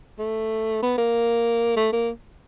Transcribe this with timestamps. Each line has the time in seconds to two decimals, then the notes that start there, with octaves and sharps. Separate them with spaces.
0.19 A3
0.83 B3
0.98 A#3
1.76 A3
1.93 A#3